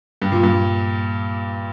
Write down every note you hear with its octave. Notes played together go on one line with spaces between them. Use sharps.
G2
A#2
G2